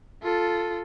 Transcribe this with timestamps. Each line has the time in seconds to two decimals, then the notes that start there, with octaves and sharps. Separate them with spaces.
0.23 F4 A4